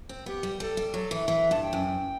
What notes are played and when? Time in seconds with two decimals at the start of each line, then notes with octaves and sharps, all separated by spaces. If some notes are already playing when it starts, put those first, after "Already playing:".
0.09 C4
0.26 B3 G4
0.43 G3
0.60 G3 A4
0.77 G3
0.94 F#3 A4
1.11 E3
1.28 E3 E5
1.51 G2 A5
1.62 G5
1.73 F#2